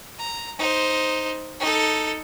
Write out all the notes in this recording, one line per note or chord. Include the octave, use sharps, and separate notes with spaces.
A#5
D#4 C5
D#4 A4